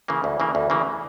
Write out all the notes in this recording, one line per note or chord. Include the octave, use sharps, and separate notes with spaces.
C#3 E3 A#3
D2
C#3 E3 A#3
D2
C#3 E3 A#3